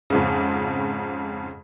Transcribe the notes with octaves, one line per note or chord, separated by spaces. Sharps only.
F2 G#2 C#3